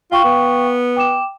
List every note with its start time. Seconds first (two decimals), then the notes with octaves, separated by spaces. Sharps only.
0.12 F4 F5 G5 C#6
0.24 B3
0.96 G5 D6 E7